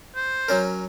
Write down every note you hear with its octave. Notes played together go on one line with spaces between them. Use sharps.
C5
F#3 C#4 A#4